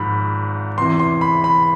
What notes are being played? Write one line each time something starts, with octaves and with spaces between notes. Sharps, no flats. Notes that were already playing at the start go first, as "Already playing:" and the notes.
Already playing: G#1 G#2 F3 B5
E2 C3 E3 C6
C6
B5
B5